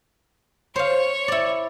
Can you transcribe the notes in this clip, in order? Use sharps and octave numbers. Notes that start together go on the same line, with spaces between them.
C5 C#5 F5
E4 D5